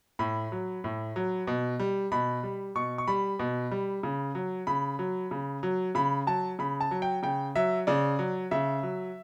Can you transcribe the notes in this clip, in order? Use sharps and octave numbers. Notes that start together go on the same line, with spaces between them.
A2 B5
F#3
A2
F#3
B2
G3
B2 B5
G3
B2 C#6
C#6
G3 B5
B2
G3
C#3
F#3
C#3 B5
F#3
C#3
F#3
C#3 B5
F#3 A5
C#3 B5
A5
F#3
G5
C#3 G5
F#3 E5
C#3 D5
F#3
C#3 E5
F#3